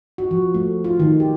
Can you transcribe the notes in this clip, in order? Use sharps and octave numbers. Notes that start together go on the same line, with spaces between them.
F#4
F3
A3
F4
D#3
G4